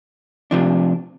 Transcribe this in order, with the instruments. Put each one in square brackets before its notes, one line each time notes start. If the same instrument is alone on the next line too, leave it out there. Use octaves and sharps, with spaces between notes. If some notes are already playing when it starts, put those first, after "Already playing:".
[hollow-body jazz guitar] C3 F3 D4